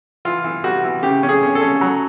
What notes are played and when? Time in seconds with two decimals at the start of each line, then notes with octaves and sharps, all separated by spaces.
0.25 E3 F4
0.44 E3
0.64 G3 F#4
0.84 E3
1.03 C#3 G4
1.23 C#4
1.29 G#4
1.43 C#4
1.55 A4
1.62 C#4
1.81 F#3